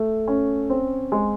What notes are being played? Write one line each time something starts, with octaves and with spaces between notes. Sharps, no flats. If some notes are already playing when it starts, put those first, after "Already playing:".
Already playing: A3
C#4
C4
G#3